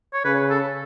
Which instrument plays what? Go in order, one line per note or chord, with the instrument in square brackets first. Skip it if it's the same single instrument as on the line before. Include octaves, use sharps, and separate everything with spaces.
[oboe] C#5
[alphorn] C#3 [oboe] B4
[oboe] A4